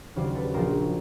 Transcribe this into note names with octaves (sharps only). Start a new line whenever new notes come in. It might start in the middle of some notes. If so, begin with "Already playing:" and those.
D#2 C#3 F#3 C5 D5
A4 B4
A#1 A#2 F3 A#4 C5